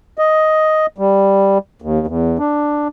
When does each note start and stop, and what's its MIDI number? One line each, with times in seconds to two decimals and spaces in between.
0.18 0.86 75
0.98 1.58 55
1.82 2.06 39
2.07 2.38 40
2.39 2.88 62